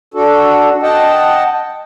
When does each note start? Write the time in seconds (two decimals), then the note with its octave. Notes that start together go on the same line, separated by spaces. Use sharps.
0.14 D4 F#4 A4
0.83 D#5 F#5 G5 A5